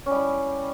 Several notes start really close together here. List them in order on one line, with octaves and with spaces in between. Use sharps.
C#4 G3 E4